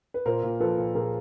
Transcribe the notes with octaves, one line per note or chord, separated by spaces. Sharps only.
B4
A#2 A#4 C5
A#2
F3 A4 B4
A#2
A#2 G#4 A#4